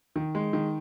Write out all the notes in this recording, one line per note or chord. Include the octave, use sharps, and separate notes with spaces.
D#3
G#3
D#3